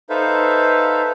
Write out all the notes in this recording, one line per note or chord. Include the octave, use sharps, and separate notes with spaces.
D#4 A4 B4 C5 E5 F5